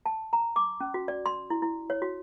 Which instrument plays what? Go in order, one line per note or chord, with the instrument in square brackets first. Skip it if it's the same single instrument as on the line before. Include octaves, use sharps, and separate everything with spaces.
[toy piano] A5
A#5
D6
C#4
F#4
D5
C6
E4
E4
C#5
F#4